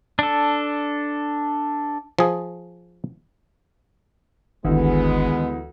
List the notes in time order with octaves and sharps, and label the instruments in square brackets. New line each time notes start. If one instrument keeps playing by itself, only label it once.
[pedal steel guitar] D4 A4
[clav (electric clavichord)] F3 G#4
[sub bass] G1 [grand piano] D2 E3 [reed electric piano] D#3 [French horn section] G#3 B3